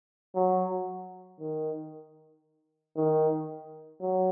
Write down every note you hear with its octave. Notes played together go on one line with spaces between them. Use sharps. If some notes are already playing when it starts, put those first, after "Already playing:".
F#3
D#3
D#3
F#3